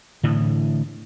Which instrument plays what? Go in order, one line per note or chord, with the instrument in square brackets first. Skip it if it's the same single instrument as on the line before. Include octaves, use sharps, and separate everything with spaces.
[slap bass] A2 D3 E3